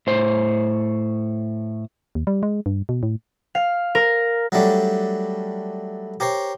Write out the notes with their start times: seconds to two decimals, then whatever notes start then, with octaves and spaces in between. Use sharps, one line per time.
0.07 A2 C5 C#5
2.15 D#2
2.27 G3
2.43 G#3
2.66 G2
2.89 B2
3.03 A2
3.55 F5
3.95 A#4
4.52 F#3 G3 A3 D4
6.20 G4 A#4 C5 C#5